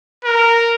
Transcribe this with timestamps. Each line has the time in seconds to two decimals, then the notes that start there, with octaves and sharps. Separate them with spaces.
0.25 A#4